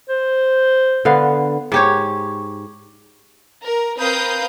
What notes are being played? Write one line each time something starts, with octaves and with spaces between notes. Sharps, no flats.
C5
D3 B3 F5
G#2 G4 C#5
A#4
C4 A#4 B4 F5 D#6 G6